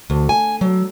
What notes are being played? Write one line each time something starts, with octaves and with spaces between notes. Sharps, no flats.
D2
G#5
F#3